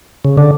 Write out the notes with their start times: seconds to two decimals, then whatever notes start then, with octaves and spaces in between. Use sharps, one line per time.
0.25 C#3
0.38 D3